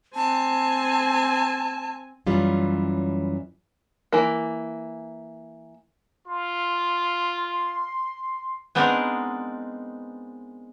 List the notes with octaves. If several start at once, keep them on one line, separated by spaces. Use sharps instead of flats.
C4 G#5 A5
F#2 E3 G3 C#4 F4
E3 A#3
F4 C6
G#3 B3 C4 D4 D#4 A#4